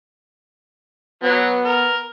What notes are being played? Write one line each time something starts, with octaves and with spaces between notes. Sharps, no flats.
F#3 B3
A#4